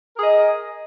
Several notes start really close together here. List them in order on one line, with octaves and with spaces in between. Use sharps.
A#4 G#4 D#5